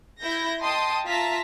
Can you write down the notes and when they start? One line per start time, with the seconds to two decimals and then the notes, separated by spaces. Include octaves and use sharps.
0.22 E4 G6 A#6
0.62 D#5 G5 A5 C6 D#6
1.05 F4 E5 A5 A#5 B6